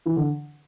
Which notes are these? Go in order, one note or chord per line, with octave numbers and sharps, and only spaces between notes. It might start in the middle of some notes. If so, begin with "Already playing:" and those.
E3
D3